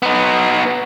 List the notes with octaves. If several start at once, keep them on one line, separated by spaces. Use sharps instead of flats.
B3 D#4